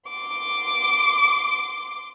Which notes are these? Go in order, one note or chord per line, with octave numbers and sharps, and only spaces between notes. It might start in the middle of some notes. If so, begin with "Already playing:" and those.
C6 D6